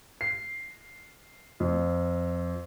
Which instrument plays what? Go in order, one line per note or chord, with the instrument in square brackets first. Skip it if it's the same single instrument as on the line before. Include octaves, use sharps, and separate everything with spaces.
[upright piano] C7
F2